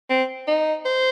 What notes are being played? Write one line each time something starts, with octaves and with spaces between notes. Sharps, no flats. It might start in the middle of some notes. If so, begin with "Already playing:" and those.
C4
D#4
C5